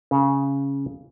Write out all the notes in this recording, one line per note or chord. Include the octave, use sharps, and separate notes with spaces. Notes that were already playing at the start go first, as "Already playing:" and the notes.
C#3